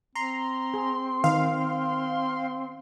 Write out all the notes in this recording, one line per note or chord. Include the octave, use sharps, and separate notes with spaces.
C4 A#5 C6
G#4
D#3 F5